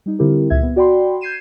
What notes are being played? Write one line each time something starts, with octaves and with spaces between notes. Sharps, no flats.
G3 D#4
D3 G3 C4 E4 G4 A#4
C#2 A#2 E5 G#6
B3
F#4 D5 G5 B5 C6
G6 G#6 C7 D#7 E7